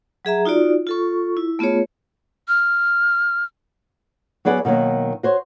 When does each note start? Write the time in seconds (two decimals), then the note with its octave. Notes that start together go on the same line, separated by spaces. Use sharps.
0.25 F#3 G#4 E5 A#5
0.45 D#4 F4 F#4 D5
0.87 F4 A4 C#6
1.37 E4
1.59 A3 B3 F4 G#4 C#5
2.48 F6
4.45 F#3 B3 G#4 D5 F#5
4.65 B2 D#3 F#3 A#3
5.23 F#4 C5 C#5